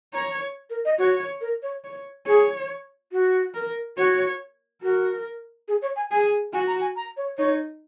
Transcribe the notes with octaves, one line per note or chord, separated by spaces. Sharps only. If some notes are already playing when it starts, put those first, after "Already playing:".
C#5 A#5
A#4
D#5
F#4 C#5
A#4
C#5
C#5
G#4 C#5
F#4
A#4
F#4 C#5
F#4 A#4
G#4
C#5
G#5
G#4 G#5
F#4 G#5
A#5
G#5
A#5
C#5
D#4 C#5